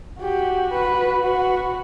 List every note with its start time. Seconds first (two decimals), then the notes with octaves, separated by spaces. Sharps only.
0.21 F#4 G4
0.73 B4
1.24 F#4 B4